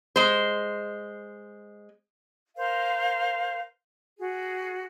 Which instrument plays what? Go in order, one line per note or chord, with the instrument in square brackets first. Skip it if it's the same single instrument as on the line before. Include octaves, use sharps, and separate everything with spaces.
[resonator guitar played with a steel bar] G#3 C5
[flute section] A#4 C5 F5
F#4 G#4